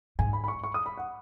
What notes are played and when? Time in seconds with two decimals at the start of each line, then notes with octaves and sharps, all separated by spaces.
0.19 G#2 G#5
0.33 B5
0.44 B5
0.48 C#6
0.64 C#6
0.74 D#6
0.86 B5
0.97 F#5